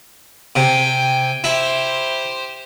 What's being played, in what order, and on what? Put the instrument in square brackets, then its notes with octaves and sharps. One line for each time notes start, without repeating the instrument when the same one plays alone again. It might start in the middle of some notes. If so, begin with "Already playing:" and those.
[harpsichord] C3 [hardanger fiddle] G5 G#5
[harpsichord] E4 [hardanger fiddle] G4 C5